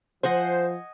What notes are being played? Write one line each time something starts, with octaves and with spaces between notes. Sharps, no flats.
F3 C5 D#5 F#5 G#5